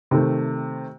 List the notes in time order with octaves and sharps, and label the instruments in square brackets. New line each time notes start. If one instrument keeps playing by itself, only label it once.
[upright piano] C3 D#3 A3